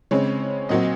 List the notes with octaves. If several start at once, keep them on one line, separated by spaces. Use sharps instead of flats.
C#3 G#3 C4 C#5
A#2 F#3 C4 D#5